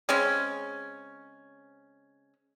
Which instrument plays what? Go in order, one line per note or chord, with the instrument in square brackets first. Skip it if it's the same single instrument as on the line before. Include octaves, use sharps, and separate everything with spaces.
[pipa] C#3 G#3 C4 C#4